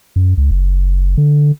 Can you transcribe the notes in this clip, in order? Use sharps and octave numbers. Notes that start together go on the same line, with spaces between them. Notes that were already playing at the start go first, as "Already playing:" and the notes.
F#2
C#2
F#1
D3